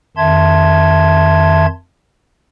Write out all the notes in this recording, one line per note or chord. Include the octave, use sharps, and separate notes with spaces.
F2 D#3 E5 A5 C6 G#6